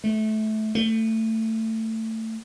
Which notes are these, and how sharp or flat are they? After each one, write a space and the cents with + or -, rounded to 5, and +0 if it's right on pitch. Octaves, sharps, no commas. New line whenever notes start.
A3 -20
A3 +20